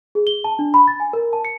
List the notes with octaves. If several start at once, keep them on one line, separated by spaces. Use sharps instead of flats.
G#4
G7
A5
D4
B5
A6
G#5
A#4
A5
C#7